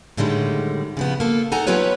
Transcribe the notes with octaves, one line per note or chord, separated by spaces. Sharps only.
A2 D3 D#3 G3 G#3
C#3 F3 B3
A#3 A4
D#4 A4 F#5 G#5 A#5
F#3 B3 F4 G4 B4 C#5